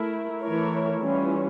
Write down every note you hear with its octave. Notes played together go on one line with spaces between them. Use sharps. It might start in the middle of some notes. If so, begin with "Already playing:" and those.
Already playing: A3 E4 A#4
E3 A3 E4 A#4 C#5
E3 G3 C#4 F4